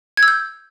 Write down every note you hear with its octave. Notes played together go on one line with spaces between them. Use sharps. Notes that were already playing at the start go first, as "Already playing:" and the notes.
G#6
E6
G6